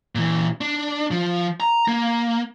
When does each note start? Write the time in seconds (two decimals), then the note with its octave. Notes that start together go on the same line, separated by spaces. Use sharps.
0.15 A#2 E3
0.61 D4
1.11 F3
1.60 A#5
1.88 A#3